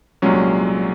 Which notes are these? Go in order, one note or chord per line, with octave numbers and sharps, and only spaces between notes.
C2 A#2 F#3 G#3 C#4